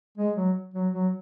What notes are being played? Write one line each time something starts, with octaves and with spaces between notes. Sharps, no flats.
G#3
F#3
F#3
F#3